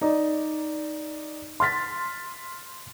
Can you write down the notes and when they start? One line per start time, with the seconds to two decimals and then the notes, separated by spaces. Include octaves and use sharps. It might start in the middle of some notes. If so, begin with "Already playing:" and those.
0.01 D#4 D5
1.60 C6 F6 A6 B6